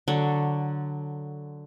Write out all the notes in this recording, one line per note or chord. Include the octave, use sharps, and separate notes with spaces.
D3 F#3